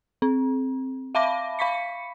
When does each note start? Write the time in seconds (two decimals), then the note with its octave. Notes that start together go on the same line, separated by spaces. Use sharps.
0.22 C4
1.15 E5 F5 A5 B5 D6 A#6
1.59 F5 B5 C#6 B6 C#7